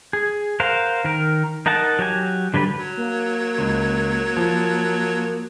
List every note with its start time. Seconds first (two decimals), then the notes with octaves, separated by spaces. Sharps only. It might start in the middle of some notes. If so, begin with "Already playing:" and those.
0.13 G#4
0.60 A#4 C5 F5 F#5
1.04 D#3 A#4
1.66 D#4 A#4 F#5 A5
1.99 F#3 G4 G#5
2.54 D3 F#3 G3 B4
2.78 F#3
2.97 A#3
3.58 C#2
4.37 F3